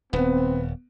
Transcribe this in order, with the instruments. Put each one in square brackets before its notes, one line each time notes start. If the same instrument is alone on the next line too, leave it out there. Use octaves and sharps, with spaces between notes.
[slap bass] D#1 [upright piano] B3 [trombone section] C4